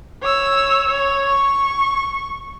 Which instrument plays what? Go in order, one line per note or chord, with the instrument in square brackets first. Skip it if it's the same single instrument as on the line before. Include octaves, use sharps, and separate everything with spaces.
[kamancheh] C#5 E6
C#5
C#6